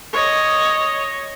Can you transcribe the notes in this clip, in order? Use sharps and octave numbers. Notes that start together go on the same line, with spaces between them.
C#5 D#5